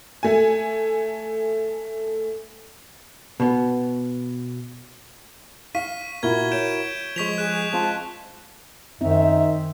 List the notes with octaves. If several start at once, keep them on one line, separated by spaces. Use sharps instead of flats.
A3 G#5
B2 B3
F5 C#6 B6 D#7
A#2 E4 F#4 A#4 G#6 G7
C#5 G6 D7 E7
F3 G#3 C#6 B6 F7
G#4 F#6 E7
G#3 C4 F4 A5
F#2 D#3 C4 D#4 E5